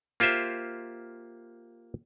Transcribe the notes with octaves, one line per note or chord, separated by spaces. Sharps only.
A#3 F4 G4 C5 E5